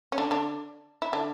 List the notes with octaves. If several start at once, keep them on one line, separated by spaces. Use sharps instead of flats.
C#4
D3 D4
D3 D4
E4
D3 D4